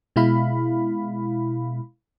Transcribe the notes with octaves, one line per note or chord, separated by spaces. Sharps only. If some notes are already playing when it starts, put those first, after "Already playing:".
B2 G#3 E4 F5 B5